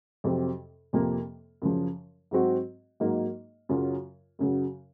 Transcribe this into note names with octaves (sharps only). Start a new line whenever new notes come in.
F2 C3 F#3 C4
F2 C3 F3 A#3
F#2 C#3 F3
G#2 F#3 C4 F#4
G#2 F#3 A#3 D#4
F#2 C#3 F#3 C#4 F4
F#2 C#3 F#3